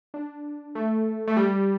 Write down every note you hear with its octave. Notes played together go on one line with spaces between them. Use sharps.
D4
A3
A3
G3